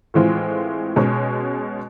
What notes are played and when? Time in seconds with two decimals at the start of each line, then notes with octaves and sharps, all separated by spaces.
0.14 A2 E3 G#3 C4 F4
0.96 B2 G#3 C#4